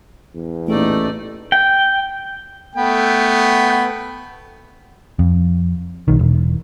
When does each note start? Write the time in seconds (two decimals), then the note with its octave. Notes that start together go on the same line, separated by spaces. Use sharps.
0.35 E2
0.67 A1 A#2 A3 D#4 D5
1.52 G5
2.75 A3 B3 G5
5.19 F2
6.08 B1 D#3
6.19 E1